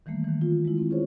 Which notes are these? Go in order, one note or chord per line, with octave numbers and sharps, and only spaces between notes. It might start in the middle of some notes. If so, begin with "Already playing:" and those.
D#3 E3 G3 A3 A#3
D#3 E3
F4
G#3 E4
C4
C#4 F4 G#4 C5 C#5